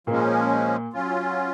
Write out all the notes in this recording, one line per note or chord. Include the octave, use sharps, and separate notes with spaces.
A#2 F3 G#3 A#3 C#4
F#3 C#4 F4